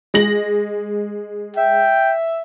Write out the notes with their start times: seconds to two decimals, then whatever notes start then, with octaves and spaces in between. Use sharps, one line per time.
0.14 G#3 A#6 F#7
1.56 E5 G5